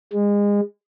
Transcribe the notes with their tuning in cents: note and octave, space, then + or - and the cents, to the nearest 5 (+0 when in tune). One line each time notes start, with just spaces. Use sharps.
G#3 -30